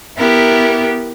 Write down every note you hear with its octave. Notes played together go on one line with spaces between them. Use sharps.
B3 E4 G4 A#4